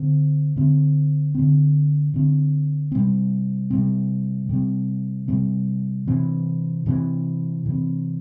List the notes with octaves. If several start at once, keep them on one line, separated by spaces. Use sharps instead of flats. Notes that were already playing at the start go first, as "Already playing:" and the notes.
Already playing: D3 C4
D3 C4
D3 C4
D3 C4
C3 G3 C4
C3 G3 C4
C3 G3 C4
C3 G3 C4
C3 E3 C4
C3 E3 C4
C3 E3 C4